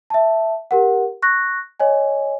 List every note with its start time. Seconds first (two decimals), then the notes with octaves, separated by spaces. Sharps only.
0.10 E5 A5
0.71 G4 A#4 F#5
1.22 C#6 F#6 A#6
1.80 C#5 D#5 G#5